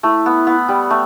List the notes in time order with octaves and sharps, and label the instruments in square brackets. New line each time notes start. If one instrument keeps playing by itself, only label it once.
[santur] A3 [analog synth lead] E4
[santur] B3
B3
G3
A3